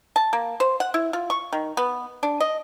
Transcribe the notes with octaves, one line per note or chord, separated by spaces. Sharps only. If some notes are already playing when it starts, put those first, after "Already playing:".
A5
A#3
C5
F#5
E4
F4
C#6
D#3
B3
D4
D#5